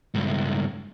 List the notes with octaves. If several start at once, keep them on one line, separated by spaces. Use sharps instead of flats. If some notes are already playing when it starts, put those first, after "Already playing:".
C#2 G2